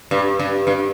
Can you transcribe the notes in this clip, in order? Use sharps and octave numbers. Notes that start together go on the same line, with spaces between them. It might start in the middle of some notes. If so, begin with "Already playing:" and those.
G2
G2
G2